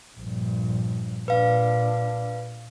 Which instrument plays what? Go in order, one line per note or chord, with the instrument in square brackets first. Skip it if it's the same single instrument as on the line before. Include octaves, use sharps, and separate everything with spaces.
[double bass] A#1 G2
[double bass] A#2 D4 [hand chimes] B4 F5